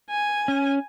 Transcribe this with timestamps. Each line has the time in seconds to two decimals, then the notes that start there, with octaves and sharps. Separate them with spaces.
0.11 G#5
0.48 C#4